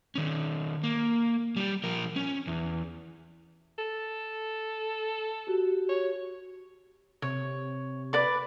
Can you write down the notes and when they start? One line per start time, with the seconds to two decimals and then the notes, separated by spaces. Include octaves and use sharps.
0.15 D#3 C#4
0.84 A#3
1.56 G3 G4
1.84 F3 A#4
2.16 C#4
2.47 E2
3.79 A4
5.47 F#4 G4
5.89 C#5
7.22 C3 C#5
8.13 B4 D5 D6